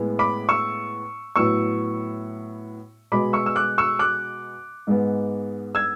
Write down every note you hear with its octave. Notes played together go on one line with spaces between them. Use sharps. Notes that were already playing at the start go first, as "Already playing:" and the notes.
Already playing: A2 G#3 B3
B5 D6
C#6 E6
A2 F#3 B3 C#6 E6
B2 G#3 B3 B5 D6
C#6 E6
E6
D6 F#6
C#6 E6
D6 F#6
G#2 G#3 B3
E6 G#6